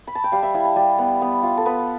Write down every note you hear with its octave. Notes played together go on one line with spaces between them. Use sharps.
B5
A5
G5
G3 F5
E5
E4 F5
A5
G3 A5
B3
B3
F4
A4
B3 B4